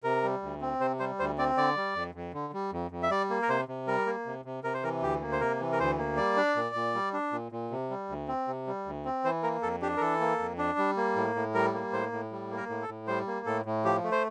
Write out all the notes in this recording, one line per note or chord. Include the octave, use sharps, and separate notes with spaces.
C3 A#4
G3
D2
C4
C3 C5
G3 C5
D2 C5
C4 D5
D3 D5
G3
F2
F2
D3
G3
F2
F2
E5
G3 D5
A#3
A#4
C3 C5
C3
G3 A#4
A#3
C3
C3
C3 A#4
C5
E3 A#4
D2 G4
A#3
C5
C3 A#4
E3
A#4
D2 C5
A#3
G3 D5
D4
A#2
A#2
G3
D4
A#2
A#2
C3
G3
D2
C4
C3
G3
D2
C4
E3 C5
A#3 A#4
F2 A4
D4 G4
A#4
E3 A4
A#3
F2
D4
G3
A#3
A2
A2
G3 A#4
A#3
A2 C5
A2
G3
A#3
A#4
A2
A4
A2
G3 C5
A#3
A2 A4
A2
F3 G4
A3
C5